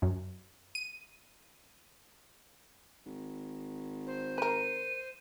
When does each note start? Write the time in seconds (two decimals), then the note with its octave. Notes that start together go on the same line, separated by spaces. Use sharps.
0.02 F#2
0.75 D#7
3.06 G#1
4.07 C5
4.38 A#4 B4 D#7